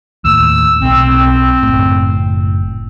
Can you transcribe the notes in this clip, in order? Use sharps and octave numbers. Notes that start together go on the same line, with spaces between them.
D#2 A2 E6
B1 C4
F#1 A2